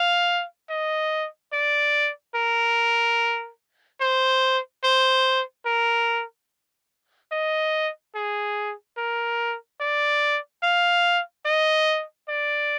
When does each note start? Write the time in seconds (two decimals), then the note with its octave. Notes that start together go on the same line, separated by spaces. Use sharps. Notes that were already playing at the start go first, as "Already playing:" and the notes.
Already playing: F5
0.69 D#5
1.53 D5
2.35 A#4
4.01 C5
4.84 C5
5.66 A#4
7.32 D#5
8.15 G#4
8.98 A#4
9.80 D5
10.63 F5
11.46 D#5
12.29 D5